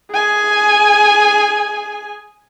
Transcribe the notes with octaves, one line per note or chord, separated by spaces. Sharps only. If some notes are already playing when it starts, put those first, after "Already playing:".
G#4 G#5